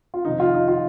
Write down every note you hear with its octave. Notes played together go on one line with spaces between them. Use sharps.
F4
F2 C3 D#3 D#4
F4
D#4
F4